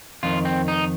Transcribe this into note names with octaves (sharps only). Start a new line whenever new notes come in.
F2 D#3 F4
C4
D#4